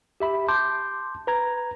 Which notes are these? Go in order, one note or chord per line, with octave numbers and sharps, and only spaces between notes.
G4 E5 B5
A5 C6 D6 G6
B4 A#5 G#6